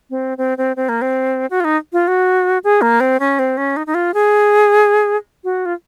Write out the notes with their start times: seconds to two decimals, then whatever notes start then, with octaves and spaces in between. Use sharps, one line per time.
0.10 C4
0.38 C4
0.58 C4
0.76 C4
0.89 A#3
1.02 C4
1.50 F#4
1.60 F4
1.64 D#4
1.93 F4
2.08 F#4
2.64 G#4
2.82 A#3
3.00 C4
3.20 C#4
3.39 C4
3.57 C#4
3.77 D#4
3.87 D#4
3.94 F4
4.14 G#4
5.44 F#4
5.66 F4